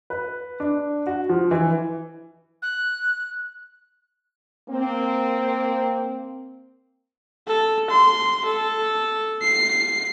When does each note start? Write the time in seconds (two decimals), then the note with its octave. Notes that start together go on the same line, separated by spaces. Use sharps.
0.10 B4
0.60 D4
1.07 F#4
1.29 F3
1.51 E3
2.62 F#6
4.69 A#3 C4
7.47 A4
7.91 C6
8.45 A4
9.42 C7